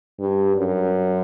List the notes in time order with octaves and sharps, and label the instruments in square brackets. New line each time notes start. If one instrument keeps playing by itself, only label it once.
[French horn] G2
F#2